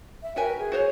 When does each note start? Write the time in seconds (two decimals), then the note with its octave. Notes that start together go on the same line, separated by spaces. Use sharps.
0.24 E5
0.36 F#4 A#4 B4 E5 G5 G#5
0.58 G#4
0.72 F#4 C5 C#5